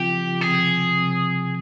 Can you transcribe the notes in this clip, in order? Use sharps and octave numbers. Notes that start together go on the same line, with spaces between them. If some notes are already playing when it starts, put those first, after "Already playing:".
Already playing: C#3 F3 C4 F4 G4
C3 F3 C4 G#4
C3 F3 C4